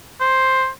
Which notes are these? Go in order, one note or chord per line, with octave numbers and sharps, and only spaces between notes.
C5